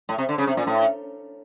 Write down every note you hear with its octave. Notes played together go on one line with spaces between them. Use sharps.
A2
C3
D3
C#3
C3
A#2
A2